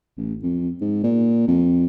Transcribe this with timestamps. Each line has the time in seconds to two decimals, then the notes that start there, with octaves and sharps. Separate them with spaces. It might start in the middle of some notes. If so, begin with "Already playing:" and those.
0.17 A1
0.43 F2
0.81 G#2
1.04 A#2
1.48 F2